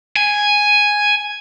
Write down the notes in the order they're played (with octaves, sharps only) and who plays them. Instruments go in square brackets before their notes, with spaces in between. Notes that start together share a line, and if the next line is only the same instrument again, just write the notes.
[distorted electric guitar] G#5